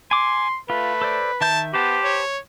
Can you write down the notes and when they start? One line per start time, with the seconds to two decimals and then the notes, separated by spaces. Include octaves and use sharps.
0.11 G#5 C6 D6
0.70 A3 F4 B4
1.02 A4 C5 D5
1.41 D#3 E5 A5 G6
1.74 B3 G4 B4 C5 A5
2.03 C#5